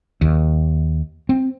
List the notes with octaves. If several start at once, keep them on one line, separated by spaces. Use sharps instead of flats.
D#2
C4